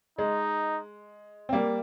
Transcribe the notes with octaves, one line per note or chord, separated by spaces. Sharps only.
G#3 D#4
C4
G3 A#3